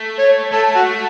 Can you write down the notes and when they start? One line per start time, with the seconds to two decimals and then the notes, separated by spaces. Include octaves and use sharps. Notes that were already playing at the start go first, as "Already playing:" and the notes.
Already playing: A3
0.19 C#5
0.53 A3 A4
0.76 F#4